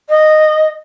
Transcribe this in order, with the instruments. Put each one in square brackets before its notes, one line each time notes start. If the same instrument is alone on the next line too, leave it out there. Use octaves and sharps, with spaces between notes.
[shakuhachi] D#5